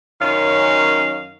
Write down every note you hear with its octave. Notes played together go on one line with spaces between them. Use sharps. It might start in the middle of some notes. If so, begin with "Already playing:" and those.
F#2 D#3 C#4 F5